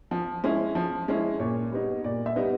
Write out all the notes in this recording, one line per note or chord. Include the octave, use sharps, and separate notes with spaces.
F3
G#3 C#4 E4
F3
G#3 C#4 E4
A#2 C#5
G3 B3 D#4
A#2 D5
E5
G3 B3 D#4